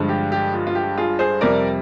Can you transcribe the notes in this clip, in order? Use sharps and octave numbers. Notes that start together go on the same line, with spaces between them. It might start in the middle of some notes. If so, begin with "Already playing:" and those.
Already playing: G2 D3 F3 G#3
G4
G4
F4
F4
G4
F4 G#4
G#4 C5
F2 C3 G3 A#4 D5